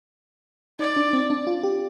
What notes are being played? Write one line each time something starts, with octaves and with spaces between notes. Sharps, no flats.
D#4 D5
D4
C4
D4
F4
G4